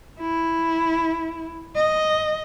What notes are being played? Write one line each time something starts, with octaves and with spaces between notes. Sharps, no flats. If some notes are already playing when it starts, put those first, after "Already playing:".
E4
D#5